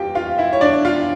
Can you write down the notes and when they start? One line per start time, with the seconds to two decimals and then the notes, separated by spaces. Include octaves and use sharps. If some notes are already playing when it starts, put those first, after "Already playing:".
Already playing: E2 E3 A#3 C#4 F4 G4 G5
0.15 F4 F5
0.38 E4 E5
0.53 C#5
0.61 D4 D5
0.85 F4 F5